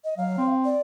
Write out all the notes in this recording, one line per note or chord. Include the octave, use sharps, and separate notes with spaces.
D#5
F#3 F5
C4
D5